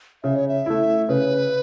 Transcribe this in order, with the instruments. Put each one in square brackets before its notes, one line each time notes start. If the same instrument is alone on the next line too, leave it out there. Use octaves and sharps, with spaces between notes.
[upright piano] C#3 [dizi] E5
[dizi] C#5
E5
[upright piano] A3 E4
[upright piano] C#3 [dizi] B4